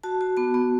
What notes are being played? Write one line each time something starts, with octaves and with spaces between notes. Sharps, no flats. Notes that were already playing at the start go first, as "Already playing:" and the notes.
F#4 A5
F#4
B3 A5
B3